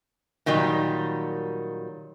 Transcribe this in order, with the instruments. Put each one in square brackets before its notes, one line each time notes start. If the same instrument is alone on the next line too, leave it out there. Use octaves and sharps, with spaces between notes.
[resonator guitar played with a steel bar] A#2 D#3 F#3 G3